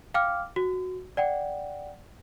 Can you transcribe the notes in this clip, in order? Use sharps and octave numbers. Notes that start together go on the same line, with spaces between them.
F5 G5 D6 F6
F#4
D5 F#5 G5